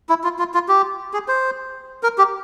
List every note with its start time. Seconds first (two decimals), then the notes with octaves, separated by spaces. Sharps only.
0.09 E4
0.24 F4
0.39 F4
0.54 F4
0.68 G4
1.13 G#4
1.28 C5
2.03 A#4
2.18 G4